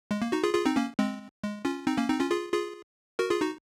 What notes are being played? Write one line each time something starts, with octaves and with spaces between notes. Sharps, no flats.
G#3
A#3
D#4 F#4
F4 G#4
F4 G#4
C4 D#4
A#3 C#4
G#3 C4
G#3
C#4 F4
C4 D#4
A#3 C#4
C4 D#4
C#4 F4
F4 G#4
F4 G#4
F#4 A#4
F4 G#4
D#4 F#4